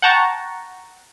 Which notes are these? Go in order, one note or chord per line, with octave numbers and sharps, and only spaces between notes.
F#5 G5 A5 A#5 C#6